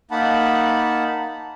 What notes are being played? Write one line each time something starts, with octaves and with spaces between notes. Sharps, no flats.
A#3 D#4 F#5 A5 B5